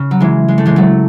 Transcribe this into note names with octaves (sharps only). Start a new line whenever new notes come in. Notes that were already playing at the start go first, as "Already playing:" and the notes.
Already playing: C#3
F#3
E3 G#3
G#3
A3
E3 G#3
F#3 A3